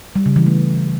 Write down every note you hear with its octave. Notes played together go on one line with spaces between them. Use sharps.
G3
C#3
E3
A3